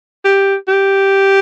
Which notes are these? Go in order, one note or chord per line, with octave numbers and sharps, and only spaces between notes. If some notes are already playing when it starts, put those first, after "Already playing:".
G4
G4